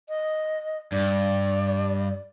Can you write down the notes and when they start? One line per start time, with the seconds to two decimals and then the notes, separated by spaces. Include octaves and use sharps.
0.09 D#5
0.92 G2 D5